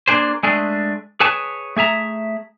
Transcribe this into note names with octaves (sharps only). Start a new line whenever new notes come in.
A#3 D4 G#4 C5
G#3 A3 D4 G#4
G#4 B4 C#5 G#5 A5
A3 G#4 E5 A#5